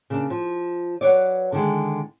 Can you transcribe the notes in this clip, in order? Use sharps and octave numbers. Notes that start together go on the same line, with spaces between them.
C#3 A#3 D4
F3
F#3 B4 C#5 D5
D3 D#3 G#3